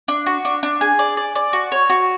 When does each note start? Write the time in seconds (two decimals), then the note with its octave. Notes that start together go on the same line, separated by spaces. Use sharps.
0.08 D4
0.26 F#4
0.45 D4
0.63 D4
0.81 G#4
0.99 D5
1.17 D5
1.35 D5
1.53 F#4
1.72 C#5
1.90 F#4